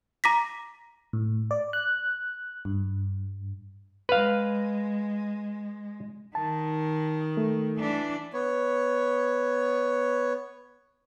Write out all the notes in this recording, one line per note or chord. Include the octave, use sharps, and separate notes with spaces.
A#5 D6 A#6 B6
A2
D5
F#6
G2
G#3 B4 F5
D#3 A5
A3
E3 D4
B3 C#5